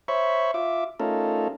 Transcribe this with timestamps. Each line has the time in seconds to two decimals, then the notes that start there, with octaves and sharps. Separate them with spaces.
0.08 C5 C#5 E5 B5 C#6
0.54 F4 E5 D6
1.00 A3 C#4 D#4 F4 A4 A#4